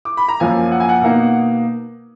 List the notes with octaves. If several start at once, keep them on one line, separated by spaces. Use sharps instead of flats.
D6
B5
A#5
F#2 F3 A#3 G#5
F#5
G#5
F#5
B2 A#3 D#4